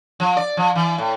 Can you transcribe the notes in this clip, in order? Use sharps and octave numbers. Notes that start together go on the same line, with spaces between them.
F3
D5
F3
E3
A2